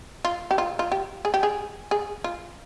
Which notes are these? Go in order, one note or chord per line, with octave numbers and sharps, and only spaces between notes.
F4
G4
F4
F4
G4
G#4
G4
G#4
G#4
F4